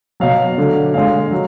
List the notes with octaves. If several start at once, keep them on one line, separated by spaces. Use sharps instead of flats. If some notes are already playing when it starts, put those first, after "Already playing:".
B2 F#3 F5
D3 F#3
D3 G#3 F5
F#3